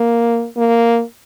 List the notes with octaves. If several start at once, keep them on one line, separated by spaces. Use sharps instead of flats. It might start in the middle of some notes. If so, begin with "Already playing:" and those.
Already playing: A#3
A#3